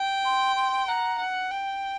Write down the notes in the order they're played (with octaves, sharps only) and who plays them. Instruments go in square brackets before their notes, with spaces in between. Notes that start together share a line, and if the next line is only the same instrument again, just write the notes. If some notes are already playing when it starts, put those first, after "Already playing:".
Already playing: [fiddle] G5
[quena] C6
C6
[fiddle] F#5 [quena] A#5
[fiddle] F#5
G5